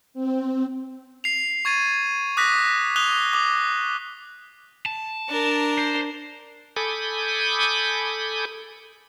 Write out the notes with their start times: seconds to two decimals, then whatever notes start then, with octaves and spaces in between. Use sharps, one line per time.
0.14 C4
1.24 C7 F7
1.65 C#6 G#6 A6 D#7
2.37 D6 D#6 F#6 A#6 B6
2.96 D#6 F#6 F7 G7
3.33 D6 D#6
4.86 A5
5.29 D4 A#4
5.78 C5
6.76 A4 G#5 B5 D6 D#6 G6